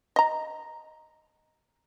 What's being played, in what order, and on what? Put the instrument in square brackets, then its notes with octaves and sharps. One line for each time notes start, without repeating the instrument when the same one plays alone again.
[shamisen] D#5 A#5